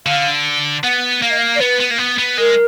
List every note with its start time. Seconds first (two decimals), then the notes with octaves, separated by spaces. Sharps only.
0.06 D3 F5
0.83 B3 F#5
1.21 A#3 F5
1.30 D#5
1.38 F5
1.55 D5
1.60 B3 B4
1.80 B3
1.91 A#3
1.98 B3
2.18 B3
2.37 G#3 A#4